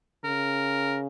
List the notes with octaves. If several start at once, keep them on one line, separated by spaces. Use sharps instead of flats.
C#3 A#4